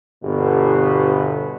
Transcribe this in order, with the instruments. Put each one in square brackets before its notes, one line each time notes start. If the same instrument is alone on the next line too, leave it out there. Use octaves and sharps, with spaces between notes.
[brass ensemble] G1 B2